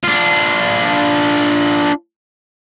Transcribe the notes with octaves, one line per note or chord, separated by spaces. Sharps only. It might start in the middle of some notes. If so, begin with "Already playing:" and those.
D4 F4